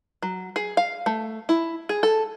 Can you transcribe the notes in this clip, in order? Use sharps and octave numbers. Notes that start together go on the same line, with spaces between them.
F#3
G#4
F5
A3
E4
G#4
A4